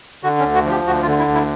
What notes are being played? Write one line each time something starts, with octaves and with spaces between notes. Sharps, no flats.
D3 F#4
C#4
D2
F#4
F3 G4
D2 F#4
F4
D3
E4
D2
E4